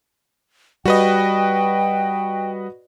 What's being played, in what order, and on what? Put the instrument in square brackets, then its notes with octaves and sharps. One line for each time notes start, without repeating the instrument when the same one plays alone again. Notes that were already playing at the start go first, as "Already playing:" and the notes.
[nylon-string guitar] G3 [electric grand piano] F#4 B4 D#5 [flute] G5